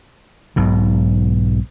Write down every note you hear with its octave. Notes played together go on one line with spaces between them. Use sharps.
B1 G#2 B2